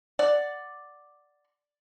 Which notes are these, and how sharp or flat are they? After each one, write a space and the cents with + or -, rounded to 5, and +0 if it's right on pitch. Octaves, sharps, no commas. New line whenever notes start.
D5 +0 F#5 +0